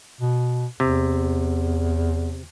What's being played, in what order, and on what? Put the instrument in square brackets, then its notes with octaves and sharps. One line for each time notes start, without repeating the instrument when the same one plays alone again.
[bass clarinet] B2
[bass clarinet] E2 [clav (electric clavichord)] C3